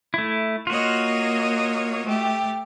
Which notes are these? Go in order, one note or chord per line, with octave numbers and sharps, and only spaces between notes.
A3 E4
A#3 F4 F#4 C#5 D#5
A3 G4